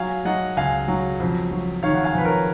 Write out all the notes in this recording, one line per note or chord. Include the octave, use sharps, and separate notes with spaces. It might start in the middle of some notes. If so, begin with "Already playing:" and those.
Already playing: F#3 F5 G#5
F#3 D#5 F#5
C#2 F5 G#5
F#3
F2
F#3
D#3 C#5 F5
F#5
F5 G#5
F2 B4
A#4 C#5